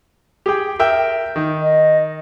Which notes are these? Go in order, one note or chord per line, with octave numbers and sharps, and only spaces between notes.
G4 G#4 G5
A#4 E5 G5
D#3
D#5